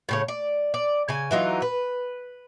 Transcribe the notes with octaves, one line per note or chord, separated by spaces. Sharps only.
A2 C#3 C#5
D5
D5
C#3 G#5
E3 F#3 D#4 F4
B4